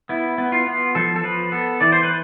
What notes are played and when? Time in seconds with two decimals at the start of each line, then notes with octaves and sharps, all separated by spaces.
0.09 B3 E4
0.38 B3
0.52 F4
0.67 B3
0.95 F3 A4
1.16 A4
1.23 F3 B4
1.52 B3 A4
1.81 E3 D5
1.92 C5
2.03 B4